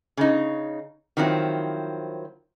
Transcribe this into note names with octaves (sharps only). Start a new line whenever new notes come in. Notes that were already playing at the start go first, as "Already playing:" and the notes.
C#3 D#4
D#3 F3 F#3 C4 E4